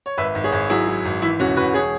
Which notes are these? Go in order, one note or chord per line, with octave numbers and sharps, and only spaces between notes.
C#5
G#1 B4 E5
G#1
G#4 C#5
G#1
F#3 E4 G#4
F#3
G#1
E3 E4
E1 C#4 F#4
E1 F#4 B4
G#4 C#5